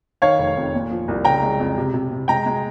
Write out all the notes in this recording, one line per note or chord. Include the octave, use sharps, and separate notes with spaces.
D#3 C#5 F5
F1
F2
A#2
F3
C2
C#3 G5 A#5
G#3
F2
C3
C3
C3
G#3 G5 A#5
G#3